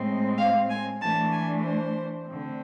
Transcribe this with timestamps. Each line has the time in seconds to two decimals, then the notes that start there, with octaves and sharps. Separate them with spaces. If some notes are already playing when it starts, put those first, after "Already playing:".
Already playing: A2 G#3 C4
0.38 F5
0.70 G#5
1.01 E3 A3 D4 A5
1.32 G#5
1.64 C5
2.26 D3 A3 C4